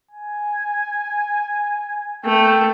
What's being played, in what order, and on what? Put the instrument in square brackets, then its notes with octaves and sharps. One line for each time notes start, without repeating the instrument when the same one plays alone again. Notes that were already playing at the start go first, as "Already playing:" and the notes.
[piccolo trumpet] G#5
[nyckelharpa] A3 [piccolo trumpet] G5